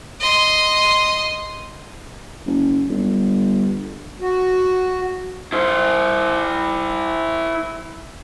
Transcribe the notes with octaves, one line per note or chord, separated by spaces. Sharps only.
D#5 C6
F#1
G1
F#4
E4 C5